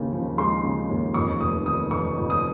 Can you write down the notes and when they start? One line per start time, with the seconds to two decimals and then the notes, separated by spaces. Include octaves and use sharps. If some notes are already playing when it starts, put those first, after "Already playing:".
Already playing: D#2 C#3
0.12 F3
0.38 G#3 C6
0.64 C#3
0.90 D#2
1.14 F2 C#6
1.40 F1 D#6
1.66 D#3 D#6
1.91 F1 C#6
2.17 F2
2.30 D#6